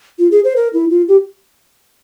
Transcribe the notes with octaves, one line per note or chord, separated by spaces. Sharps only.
F4
G#4
C5
A#4
E4
F4
G4